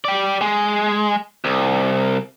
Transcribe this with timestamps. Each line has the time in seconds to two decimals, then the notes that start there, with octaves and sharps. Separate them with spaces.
0.05 G4 D5
0.41 G#3
1.45 C2